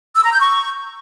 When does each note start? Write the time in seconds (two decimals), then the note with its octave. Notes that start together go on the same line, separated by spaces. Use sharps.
0.15 E6
0.23 A#5
0.32 G6
0.40 C#6